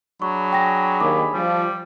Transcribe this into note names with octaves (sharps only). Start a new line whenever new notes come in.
F#3 D4 G#4 B5 C#6
G5 C#6 A#6
D#2 D6
F3 G3